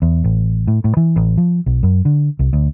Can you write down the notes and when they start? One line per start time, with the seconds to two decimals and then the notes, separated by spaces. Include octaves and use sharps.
0.02 E2
0.24 A1
0.67 A2
0.84 A2
0.97 E3
1.16 A1
1.37 F3
1.66 B1
1.83 F#2
2.05 D3
2.39 C2
2.53 D2